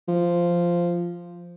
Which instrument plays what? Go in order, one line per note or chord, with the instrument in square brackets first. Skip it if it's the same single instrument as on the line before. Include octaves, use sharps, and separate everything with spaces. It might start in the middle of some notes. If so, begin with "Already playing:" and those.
[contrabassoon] F3